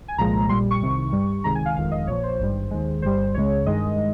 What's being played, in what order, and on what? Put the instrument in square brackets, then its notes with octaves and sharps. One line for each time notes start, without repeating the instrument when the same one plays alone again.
[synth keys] G#5
C2 A#2 F3 G#3 A#5
A#1 A#2 G3 C6
C#6
C2 C3 D#3
G2 G3
C#2 C3 D#3 G#3 A#5
G#5
F5
G1 F2 D#3 G#3 F5
D#5
A#1 A#2 F3 C#5
C5
G#1 G2 G3
D#2 D#3 G#3
G1 G2 G3 C5
C#2 C#3 G#3 C#5
G2 D#3 G#3 D#5